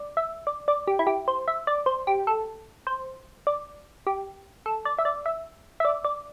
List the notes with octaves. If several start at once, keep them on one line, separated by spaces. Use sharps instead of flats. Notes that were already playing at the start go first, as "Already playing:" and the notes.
Already playing: D5
E5
D5
D5
G4
E4
G4
C5
E5
D5
C5
G4
A4
C5
D5
G4
A4
D5
E5
D5
E5
E5
D5
D5